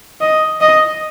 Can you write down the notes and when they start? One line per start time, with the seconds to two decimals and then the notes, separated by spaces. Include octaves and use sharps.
0.21 D#5
0.61 D#5